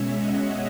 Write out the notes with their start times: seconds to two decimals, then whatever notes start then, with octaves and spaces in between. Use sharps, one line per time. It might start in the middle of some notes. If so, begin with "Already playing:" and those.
Already playing: B2 G#3 C#4 C#5 E5
0.13 D#5 F#5